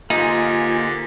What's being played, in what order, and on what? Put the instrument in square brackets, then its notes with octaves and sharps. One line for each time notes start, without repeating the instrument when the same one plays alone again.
[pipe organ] D3 G4 A#6 [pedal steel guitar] A#3 C5 [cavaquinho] D#4 [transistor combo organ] F4 G#5